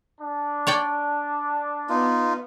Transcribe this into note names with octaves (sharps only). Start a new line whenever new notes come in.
D4
C#5 D5 G5
B3 D#4 F4